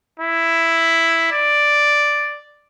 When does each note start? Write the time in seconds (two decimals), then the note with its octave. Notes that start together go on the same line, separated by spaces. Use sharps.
0.19 E4
1.32 D5